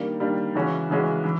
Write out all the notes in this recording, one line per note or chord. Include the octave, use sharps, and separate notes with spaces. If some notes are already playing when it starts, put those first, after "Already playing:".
Already playing: D#3 G3 A#3 D4
D#3 G3 A#3 D4
C#3 E3 G#3 C#4 F#4
C#3 E3 G#3 C#4 F#4
E3